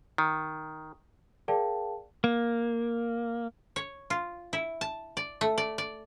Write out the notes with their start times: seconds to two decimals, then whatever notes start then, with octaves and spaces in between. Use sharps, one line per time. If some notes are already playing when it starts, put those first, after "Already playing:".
0.18 D#3
1.48 G#4 A#4 D5 F5 G5 A5
2.24 A#3
3.76 C#5
4.10 F4
4.53 E4
4.81 A5
5.17 D5
5.41 A3
5.58 D5
5.78 D5